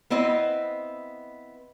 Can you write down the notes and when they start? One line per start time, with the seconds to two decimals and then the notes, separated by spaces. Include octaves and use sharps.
0.10 B3 C4 E4 D#5